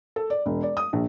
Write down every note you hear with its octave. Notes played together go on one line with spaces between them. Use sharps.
A4
D5
E1
D5
D#6
A#1